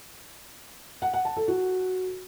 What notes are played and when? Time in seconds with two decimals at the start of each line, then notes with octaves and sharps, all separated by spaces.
1.02 F#5
1.13 F#5
1.25 A5
1.36 A4
1.48 F#4